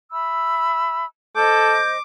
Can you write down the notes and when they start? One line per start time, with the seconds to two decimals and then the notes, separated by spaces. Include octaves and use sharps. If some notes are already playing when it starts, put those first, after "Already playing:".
0.12 E5 B5 E6
1.36 A4 C5 D#5 D6 G6